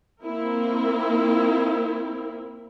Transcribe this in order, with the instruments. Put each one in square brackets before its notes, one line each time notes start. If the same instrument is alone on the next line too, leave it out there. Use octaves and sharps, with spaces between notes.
[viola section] A#3 C4 E4 A#4